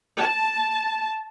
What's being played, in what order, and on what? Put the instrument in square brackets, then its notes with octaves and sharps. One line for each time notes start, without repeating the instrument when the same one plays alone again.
[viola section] A5